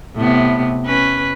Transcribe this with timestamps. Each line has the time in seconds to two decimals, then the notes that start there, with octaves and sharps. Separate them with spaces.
0.16 A2 C3 B3
0.85 C#4 B4